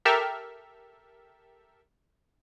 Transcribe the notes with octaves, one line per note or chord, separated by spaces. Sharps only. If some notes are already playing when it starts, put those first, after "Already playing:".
G4 A4 A#4 E5 G5 F6